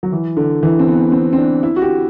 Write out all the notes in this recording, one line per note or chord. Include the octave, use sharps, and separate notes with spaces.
F#3
E3
D3
E3
C4
B3
C4
C4
D4
E4
F#4
G4